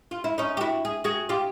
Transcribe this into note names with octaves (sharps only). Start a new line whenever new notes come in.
F4
E4
C#4 D#4
G4
E4 F#4
G#4
F#4 G#4
F4 G4